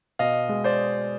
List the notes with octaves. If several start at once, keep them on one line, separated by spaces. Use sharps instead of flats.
B2 D#5 F5
G#3
C5 D5